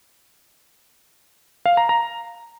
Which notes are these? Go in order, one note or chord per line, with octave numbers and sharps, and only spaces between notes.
F5
A#5
A#5